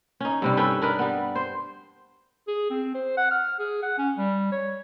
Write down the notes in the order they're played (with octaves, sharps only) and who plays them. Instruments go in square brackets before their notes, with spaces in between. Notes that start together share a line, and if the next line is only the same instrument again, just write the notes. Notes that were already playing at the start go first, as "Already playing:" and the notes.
[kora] C#4 D#4
G2 C3 G3
C#4 A4 B4 G5
D4 A#4 B4 D#5
G3 B3
C5
[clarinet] G#4
C4
C5
F#5
F6
G#4
F#5
C#4
G3
C#5